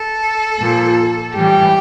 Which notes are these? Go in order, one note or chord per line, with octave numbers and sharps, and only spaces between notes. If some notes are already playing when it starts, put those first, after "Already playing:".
Already playing: A4
A#2 F3
A2 E3 G3 G4